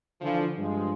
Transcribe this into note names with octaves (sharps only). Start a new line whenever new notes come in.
D3 E3 F3
G2 F3 G#3